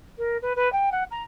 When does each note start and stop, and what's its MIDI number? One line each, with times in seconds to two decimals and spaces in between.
0.18 0.37 70
0.42 0.55 71
0.56 0.71 71
0.72 0.89 79
0.92 1.03 78
1.11 1.23 82